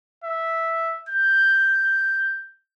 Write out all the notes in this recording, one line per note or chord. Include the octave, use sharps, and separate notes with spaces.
E5
G6